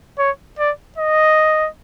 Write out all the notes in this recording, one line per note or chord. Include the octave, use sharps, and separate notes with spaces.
C#5
D5
D#5